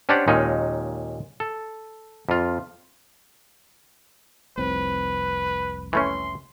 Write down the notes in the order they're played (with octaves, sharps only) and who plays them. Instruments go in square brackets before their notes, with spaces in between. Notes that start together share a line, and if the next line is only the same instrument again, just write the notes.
[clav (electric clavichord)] C#4 D4 G4 C5 D5 F#5
D#2 A#2 G#3 C#4 D#4
A4
F2 F4
[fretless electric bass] F1 C2 C4 [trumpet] B4
[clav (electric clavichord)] E3 A3 C#4 [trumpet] C6